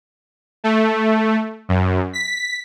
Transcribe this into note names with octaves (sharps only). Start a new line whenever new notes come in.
A3
F#2
B6